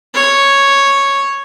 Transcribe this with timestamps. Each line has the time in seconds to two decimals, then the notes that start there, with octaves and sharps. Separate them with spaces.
0.14 C#5